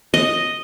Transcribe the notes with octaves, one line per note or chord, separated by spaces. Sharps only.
D#5